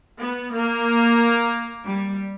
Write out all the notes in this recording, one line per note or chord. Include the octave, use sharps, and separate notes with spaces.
B3
A#3
G3